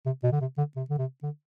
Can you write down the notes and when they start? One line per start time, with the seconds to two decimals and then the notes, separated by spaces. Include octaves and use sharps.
0.06 C3
0.24 B2
0.32 D3
0.41 C3
0.58 D3
0.76 C3
0.90 D3
0.99 C3
1.23 D3